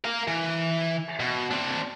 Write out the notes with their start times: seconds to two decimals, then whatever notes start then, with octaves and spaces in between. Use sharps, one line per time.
0.05 A#4 F5
0.28 E3
1.20 B2
1.51 C4 D4